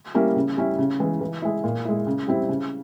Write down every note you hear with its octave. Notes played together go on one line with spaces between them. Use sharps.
G3 A#3 C#4 E4
C#3
G3 C#4 E4
C#3
E3 G#3
E3
G#3 E4
A#2
G#3 E4
C#3
G3 C4 E4
C#3